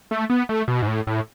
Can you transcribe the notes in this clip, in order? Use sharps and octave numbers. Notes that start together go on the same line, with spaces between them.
A3
B3
A3
B2
G#2
A2
A2